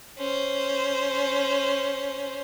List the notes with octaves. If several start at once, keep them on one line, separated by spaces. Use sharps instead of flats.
C#4 C5